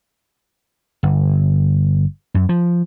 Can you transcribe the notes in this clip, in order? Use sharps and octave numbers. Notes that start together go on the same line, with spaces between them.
G1
F#2
F3